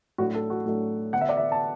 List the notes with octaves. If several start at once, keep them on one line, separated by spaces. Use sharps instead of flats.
A2 F#3 A3 D4 F#4
A4
F#4
A2 F#3 A3 D4
D3 B3 D4 F#5
E5
D5
E5
A5